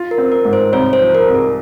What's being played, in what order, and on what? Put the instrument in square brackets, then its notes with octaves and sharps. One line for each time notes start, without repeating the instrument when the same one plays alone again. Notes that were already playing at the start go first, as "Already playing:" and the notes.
Already playing: [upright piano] F4
[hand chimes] A#4
[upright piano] C4
[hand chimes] A#4
[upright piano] G#2
[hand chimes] C5
[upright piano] C2 [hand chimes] C#5
[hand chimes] C5
[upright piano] F3
[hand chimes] A#4
[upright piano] C2
[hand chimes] G#4